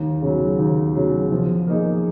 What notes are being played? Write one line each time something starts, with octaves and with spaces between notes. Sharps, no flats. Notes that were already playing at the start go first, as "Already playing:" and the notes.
Already playing: D#2
C#3 F#3
D#2
C#3 F#3
F3
A#3 D#4 G#4